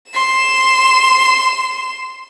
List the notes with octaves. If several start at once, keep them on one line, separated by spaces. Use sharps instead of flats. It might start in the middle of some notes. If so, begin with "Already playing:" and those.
C6 E7